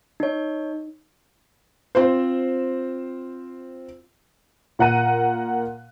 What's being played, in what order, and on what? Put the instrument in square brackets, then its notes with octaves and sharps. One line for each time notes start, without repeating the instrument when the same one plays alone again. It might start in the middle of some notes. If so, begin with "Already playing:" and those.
[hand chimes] D#4 C#5
[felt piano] C4 F4 C5
[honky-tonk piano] A#2 A#4 F#5 A#5 F#6 D#7